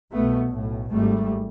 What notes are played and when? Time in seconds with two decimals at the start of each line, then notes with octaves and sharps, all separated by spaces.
0.12 C2 B2 A3 B3
0.51 B1 A2
0.90 G#1 G#2 G3 A3